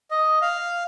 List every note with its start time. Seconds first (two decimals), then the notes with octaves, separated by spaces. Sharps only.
0.11 D#5
0.42 F5